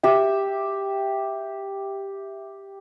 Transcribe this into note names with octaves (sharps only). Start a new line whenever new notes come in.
G4 E5 G5